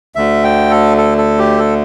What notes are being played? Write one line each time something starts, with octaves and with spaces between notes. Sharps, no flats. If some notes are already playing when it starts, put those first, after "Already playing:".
D2 D3 A3 E5
G5
A4
A4
A4
G4
A4